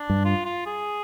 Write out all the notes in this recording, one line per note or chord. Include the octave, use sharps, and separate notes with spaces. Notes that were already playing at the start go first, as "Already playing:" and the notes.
Already playing: D4
G2
F4
F4
G#4